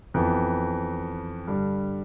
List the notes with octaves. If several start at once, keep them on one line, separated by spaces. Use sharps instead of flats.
F2 E3 B3
G2 D3 G3